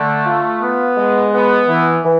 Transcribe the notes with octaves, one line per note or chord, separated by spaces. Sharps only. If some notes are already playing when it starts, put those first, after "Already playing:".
Already playing: D3 A3
F4
B3
G#3
B3
E3
E3